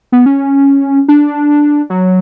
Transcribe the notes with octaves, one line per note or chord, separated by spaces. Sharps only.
B3
C#4
D4
F#3